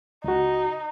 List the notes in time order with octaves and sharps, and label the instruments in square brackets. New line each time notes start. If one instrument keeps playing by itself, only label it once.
[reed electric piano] C#2 F#4 [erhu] D#4